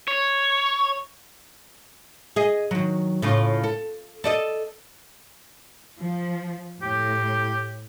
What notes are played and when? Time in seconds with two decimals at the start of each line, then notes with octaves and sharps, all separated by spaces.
0.08 C#5
2.36 G#4 D#5
2.71 D#3 F#3
3.22 A2 C#3 F4
3.63 A4
4.24 A4 D5 D#5
5.99 F3
6.82 A2 G4